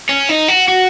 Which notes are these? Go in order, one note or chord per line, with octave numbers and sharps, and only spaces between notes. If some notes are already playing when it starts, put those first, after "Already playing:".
C#4
D#4
F#4
F#4